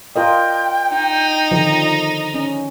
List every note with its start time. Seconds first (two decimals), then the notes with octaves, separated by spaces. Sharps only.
0.16 F4 A#4 D#5 G5
0.97 D#4
1.51 D3 D#3 F3
2.34 C#4